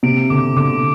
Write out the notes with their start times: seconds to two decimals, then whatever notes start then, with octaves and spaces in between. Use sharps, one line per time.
0.03 C3 D7
0.30 D3 D6
0.57 D3 D6